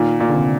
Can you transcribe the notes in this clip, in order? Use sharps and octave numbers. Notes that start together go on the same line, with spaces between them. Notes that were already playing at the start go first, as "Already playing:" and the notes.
Already playing: A#2 D#3
A#2
D3
C3